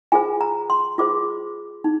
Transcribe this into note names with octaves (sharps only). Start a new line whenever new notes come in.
F4 G#4 C5 G#5
A#5
C6
F4 G#4 C5 D6
D#4